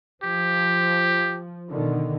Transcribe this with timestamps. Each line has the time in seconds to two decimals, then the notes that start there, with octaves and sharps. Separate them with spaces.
0.23 F3 G4
1.71 B2 D3 D#3